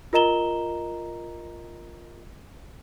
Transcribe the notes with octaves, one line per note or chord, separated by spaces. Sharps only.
F4 A#4 D#5 A#5 E7 G7